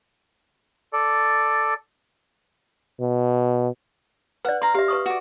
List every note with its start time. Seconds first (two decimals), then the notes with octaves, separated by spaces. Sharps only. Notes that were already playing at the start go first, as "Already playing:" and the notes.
0.93 A4 D5
3.00 B2
4.45 B4 D5 F#5
4.62 F5 A#5 C6
4.74 G4 E5 F5
4.88 B4 C#6 D#6
5.06 F#4 D5